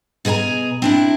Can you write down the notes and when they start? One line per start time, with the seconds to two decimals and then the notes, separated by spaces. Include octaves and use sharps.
0.25 B2 G#4 A#4 G#5 A#5
0.82 C4 D4 E4